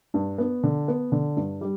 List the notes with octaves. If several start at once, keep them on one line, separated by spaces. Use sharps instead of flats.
G2
B3
D3
B3
D3
G2
G3